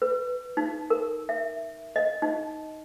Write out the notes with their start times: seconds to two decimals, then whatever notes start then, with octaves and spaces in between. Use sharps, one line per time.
0.02 B4
0.57 D#4
0.90 A#4
1.29 E5
1.96 D#5
2.22 D#4